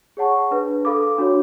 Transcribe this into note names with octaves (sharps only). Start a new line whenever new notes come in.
G#4 C#5 F#5 A5 C#6
D4 G#4 B4
A4 F5 B5 D6
D4 F#4 C#5